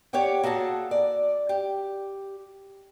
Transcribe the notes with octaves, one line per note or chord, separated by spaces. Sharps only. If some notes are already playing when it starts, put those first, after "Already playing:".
G4 C#5 D5 F#5 G5
A#3 F#4 G#4 A4 A5
D5
G4